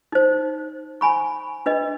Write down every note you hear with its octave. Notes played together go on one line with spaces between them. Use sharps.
D#4 C5
G#5 B5 C#6
D4 B4 D#5